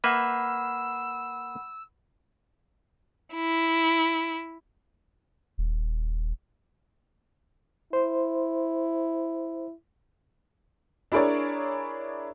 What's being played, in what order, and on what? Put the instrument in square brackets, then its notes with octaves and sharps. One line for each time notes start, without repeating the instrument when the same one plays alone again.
[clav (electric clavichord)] A#3 B4 E5 [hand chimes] F#5 B5 [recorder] E6
[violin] E4
[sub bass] D#1
[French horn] E4 [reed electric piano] C5
[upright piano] D4 E4 G#4 A#4 C#5 D5